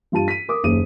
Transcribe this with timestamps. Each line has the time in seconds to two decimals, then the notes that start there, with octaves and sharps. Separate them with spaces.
0.12 G2 F4 G4 A5 D#7
0.28 B6 D#7
0.48 A#4 D6 D#6
0.64 F#1 D#2 D#7